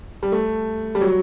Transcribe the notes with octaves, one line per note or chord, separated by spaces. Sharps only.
G3
A3
G3
F#3